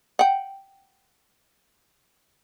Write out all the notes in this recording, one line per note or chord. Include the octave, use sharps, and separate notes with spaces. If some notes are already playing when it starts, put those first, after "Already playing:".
F#5 G5